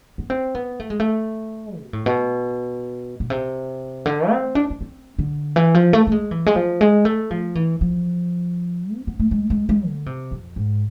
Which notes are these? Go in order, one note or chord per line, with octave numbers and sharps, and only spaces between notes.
B3
C4
B3
A3
G#3
A3
B2
A2
B2
B2
C3
D3
C4
D4
D4
C4
D3
E3
F3
A3
A3
G#3
E3
G#3
F3
G#3
A3
F3
E3
F3
C4
B3
A3
G#3
G#3
G#3
D3
C3
F2
G#2